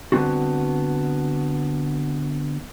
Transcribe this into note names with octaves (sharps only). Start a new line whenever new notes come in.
D3 G3 B3 C4 F4 F#4